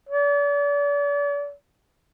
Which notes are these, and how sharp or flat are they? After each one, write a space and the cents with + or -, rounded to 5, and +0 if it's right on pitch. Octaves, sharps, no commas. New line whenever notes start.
D5 -40